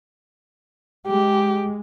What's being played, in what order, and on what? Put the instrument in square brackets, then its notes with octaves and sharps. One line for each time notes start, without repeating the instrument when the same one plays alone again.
[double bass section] G#3 [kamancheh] G4